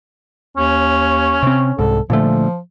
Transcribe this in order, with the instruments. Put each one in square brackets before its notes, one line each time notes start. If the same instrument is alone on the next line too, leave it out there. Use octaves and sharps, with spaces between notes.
[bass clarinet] D#2 [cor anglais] C#4
[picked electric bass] C3 C4
[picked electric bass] C2 G#2 [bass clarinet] A4
[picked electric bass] A#2 D3 A3 [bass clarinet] F3